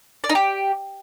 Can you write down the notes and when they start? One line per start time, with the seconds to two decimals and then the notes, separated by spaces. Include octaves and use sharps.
0.24 D5
0.29 D#4
0.35 G4